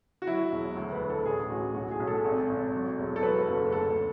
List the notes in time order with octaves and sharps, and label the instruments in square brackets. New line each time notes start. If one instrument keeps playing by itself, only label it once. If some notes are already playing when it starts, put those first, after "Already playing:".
[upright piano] F#4
F#3 E4
E1
D2
B4
D2
A4
A1 G#4
A1 F#4
B1 F#4
G#4
B1
A4
G#1
G#1
F#3
E1
A4
F#3 B4
F#1 A4
D2 A4